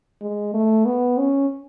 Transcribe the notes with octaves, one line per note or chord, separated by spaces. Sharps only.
G#3
A3
B3
C#4